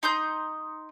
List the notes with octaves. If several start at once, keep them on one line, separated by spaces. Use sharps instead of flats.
D#4 C6 D#6 G6